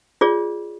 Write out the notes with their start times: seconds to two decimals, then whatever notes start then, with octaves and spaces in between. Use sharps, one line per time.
0.21 F4 G#4 C#5 D5